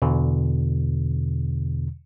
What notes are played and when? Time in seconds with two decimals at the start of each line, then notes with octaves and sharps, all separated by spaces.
0.02 E2 B2 D3